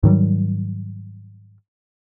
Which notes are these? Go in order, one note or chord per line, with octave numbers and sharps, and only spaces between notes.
G#2 D#3 F#3 G3